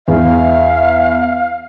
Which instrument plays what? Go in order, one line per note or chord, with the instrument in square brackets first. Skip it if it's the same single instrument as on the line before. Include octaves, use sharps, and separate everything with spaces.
[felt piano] E2 [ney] E5 [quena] F5